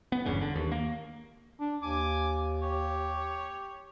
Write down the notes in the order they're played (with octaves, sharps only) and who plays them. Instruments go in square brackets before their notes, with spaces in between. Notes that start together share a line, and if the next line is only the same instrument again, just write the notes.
[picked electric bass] B3
G1 E2 G2 C#3
D3
D#2
A#3
[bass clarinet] D4
[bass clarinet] D#2 [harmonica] G#5 D6
[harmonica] G4 C#5